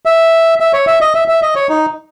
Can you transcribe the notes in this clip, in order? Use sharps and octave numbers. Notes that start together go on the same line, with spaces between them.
E5
E5
C#5
E5
D#5
E5
E5
D#5
C#5
D#4